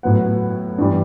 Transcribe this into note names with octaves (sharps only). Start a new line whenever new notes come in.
A2 F#3 B3 F#5
G2 E3 G3